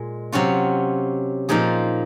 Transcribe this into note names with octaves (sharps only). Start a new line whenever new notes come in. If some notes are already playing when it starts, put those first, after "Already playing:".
Already playing: A#2 G#3
C3 F#3 C#4 F4
A#2 F3 A#3 D#4 G#4